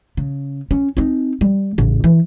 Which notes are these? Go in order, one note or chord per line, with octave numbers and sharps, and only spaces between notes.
C#3
C#4
C4 D#4
G3
A1 C#3
E3